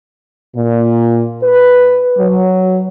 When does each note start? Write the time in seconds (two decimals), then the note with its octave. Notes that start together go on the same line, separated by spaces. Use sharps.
0.56 A#2
1.43 B4
2.18 F#3